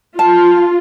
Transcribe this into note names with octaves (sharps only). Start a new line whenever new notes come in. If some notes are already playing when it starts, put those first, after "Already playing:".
F4 A5